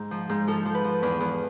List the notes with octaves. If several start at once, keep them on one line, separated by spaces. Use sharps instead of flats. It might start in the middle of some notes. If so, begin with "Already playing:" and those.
Already playing: G#2
F3
G#2
F3 A4
F3
B4
F3
E2 B4
E2